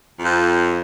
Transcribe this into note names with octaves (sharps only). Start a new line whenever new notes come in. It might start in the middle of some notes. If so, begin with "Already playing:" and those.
F2